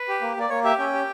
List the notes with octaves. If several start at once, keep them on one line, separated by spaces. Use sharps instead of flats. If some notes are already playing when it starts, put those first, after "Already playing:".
Already playing: B4
G4
A#3
A#3 D5
A#3 C#5
G4 E5
C#4 G5
G4